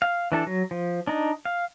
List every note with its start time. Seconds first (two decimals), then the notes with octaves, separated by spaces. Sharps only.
0.02 F5
0.32 E3 D4 A4
0.46 F#3
0.71 F3
1.07 D4 D#4
1.45 F5